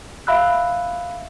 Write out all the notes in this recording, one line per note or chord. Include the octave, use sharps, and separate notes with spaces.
E5 F5 B5 E6 F#6